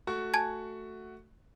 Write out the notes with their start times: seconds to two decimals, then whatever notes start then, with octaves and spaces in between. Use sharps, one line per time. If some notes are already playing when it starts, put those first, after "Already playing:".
0.07 A3 F#4 C#6
0.34 G#5 A5 G#6